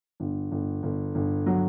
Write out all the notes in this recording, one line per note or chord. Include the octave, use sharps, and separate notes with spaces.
G1
G1
G1
G1
F#3